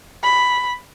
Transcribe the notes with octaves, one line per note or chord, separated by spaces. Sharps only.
B5